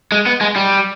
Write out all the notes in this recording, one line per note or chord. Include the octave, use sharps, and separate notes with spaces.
G#3
B3
G#3
G3